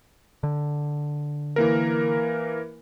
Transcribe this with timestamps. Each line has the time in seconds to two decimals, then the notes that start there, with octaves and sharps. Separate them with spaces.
0.43 D3
1.56 E3 A#3 A#4